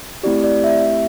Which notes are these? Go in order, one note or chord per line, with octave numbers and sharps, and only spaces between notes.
A3 C4 E4 G4 D5
D5
E5